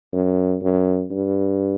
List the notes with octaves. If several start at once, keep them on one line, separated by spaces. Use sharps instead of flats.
F#2
F#2
G2